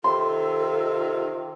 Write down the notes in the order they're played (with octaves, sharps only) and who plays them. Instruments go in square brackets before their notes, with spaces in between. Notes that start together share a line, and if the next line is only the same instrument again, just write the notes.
[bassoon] C3 [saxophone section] D#3 F4 [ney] A4 [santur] C6